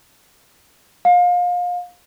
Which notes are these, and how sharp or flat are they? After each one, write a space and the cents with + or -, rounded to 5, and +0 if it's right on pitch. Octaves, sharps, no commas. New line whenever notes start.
F5 +30